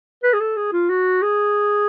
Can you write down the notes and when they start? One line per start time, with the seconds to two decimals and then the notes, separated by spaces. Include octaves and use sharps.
0.23 B4
0.33 G#4
0.40 A4
0.56 G#4
0.72 F4
0.89 F#4
1.22 G#4